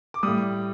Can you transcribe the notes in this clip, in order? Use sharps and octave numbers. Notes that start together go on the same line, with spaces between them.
D6
A2 G3 D#6